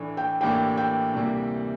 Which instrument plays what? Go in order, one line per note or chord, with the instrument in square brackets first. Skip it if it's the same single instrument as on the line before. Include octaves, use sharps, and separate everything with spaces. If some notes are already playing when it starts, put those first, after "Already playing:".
Already playing: [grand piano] A2 E3 A3 D4
[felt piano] G5
[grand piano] A2 E3 A#3 D4 G4 [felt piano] G5
[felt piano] G5
[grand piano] D2 C3 E3 G3 A#3